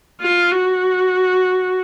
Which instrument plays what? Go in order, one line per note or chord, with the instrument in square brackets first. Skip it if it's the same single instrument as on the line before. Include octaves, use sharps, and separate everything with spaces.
[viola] F4
F#4